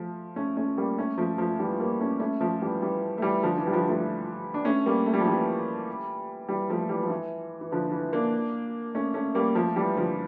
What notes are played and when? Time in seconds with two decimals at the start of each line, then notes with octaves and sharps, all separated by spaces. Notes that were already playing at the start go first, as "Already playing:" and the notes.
Already playing: F3 A3
0.36 A3 C#4
0.57 A3 C#4
0.78 G3 A#3
0.98 A3 C#4
1.18 F3 A3
1.38 F3 A3
1.59 E3 G3
1.79 G3 A#3
2.00 A3 C#4
2.20 A3 C#4
2.41 F3 A3
2.61 E3 G3
2.82 E3 G3
3.18 A3
3.22 E3 G3
3.43 D3 F3
3.58 E3
3.67 G3
3.73 D3 F3
3.88 F3 A3
4.54 D4
4.65 A3 C#4
4.86 G3 A#3
5.06 A3
5.14 G3
5.20 F3
5.27 E3 G3
6.49 E3 G3
6.70 F3 A3
6.89 E3 G3
7.03 F3
7.10 E3
7.61 E3
7.72 D3 F3
7.92 E3
8.13 A#3 D4
8.95 A3 C#4
9.14 A3 C#4
9.35 G3 A#3
9.55 F3 A3
9.76 E3 G3
9.96 D3 F3